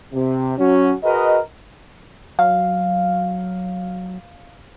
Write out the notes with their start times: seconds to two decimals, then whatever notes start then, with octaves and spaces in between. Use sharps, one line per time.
0.13 C3
0.58 F#3 C#4 F#4
1.04 F#4 G#4 A#4 B4 D#5
2.39 F#3 F5